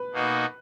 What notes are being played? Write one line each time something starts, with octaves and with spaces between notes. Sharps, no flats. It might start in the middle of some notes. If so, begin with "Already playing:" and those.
Already playing: B4
B2 A#3 D#4 F#4